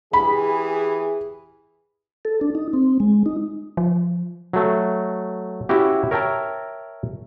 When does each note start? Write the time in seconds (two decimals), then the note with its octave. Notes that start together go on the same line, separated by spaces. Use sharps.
0.13 E3 G4 G#4 B5
2.25 A4
2.41 D4
2.55 D#4
2.73 C4
3.00 G#3
3.26 D#4
3.77 F3
4.53 F#3 A3
5.69 C#4 E4 F#4 G4
6.11 A#4 C#5 E5 G5 A5 A#5